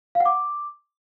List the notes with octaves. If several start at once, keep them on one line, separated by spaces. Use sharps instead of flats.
F5
F#5
D6